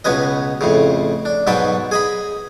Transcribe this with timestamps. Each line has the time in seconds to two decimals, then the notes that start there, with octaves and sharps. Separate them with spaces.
0.05 C#2 B2 C#4 B4 D#5
0.61 F2 A2 C#3
1.25 D4
1.47 G#2 B2 F#3 B4 G5 A5
1.92 G#4 D#5 B5